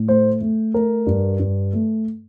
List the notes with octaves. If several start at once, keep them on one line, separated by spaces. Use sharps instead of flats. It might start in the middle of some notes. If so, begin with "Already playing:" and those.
Already playing: A2
A3 C5
A3
A3 A#4
G2
G2
A3